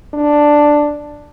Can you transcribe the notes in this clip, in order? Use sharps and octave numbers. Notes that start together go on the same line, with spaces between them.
D4